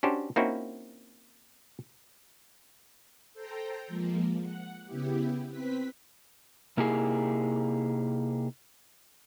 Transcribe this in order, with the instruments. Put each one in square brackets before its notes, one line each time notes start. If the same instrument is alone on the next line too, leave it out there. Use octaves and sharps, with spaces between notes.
[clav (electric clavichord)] C#4 D4 F#4 G4 C5
A#3 C4 C#4 D#4 E4 F#4
[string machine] A4 C5 G5 A#5
F3 G#3 A#3
F#5
C#3 B3 E4 G4
C4 B4 B6
[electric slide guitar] C3 A#3 D#4 E4 G4 G#4